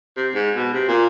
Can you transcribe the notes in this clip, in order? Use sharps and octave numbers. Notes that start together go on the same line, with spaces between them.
C3
G#2
B2
C3
A#2